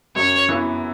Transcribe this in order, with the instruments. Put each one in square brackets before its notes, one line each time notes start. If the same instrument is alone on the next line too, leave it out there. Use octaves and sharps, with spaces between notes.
[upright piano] F#2 [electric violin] C#5
[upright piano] E3 B3 E4